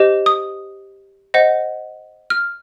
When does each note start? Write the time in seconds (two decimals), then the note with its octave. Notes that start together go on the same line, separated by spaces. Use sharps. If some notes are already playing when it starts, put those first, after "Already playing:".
Already playing: G4 C5 D#5
0.26 D#6
1.34 C5 D#5 F#5
2.30 F6